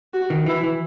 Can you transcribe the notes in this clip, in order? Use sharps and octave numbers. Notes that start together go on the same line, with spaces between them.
F#4
D#3
E3 E4
E3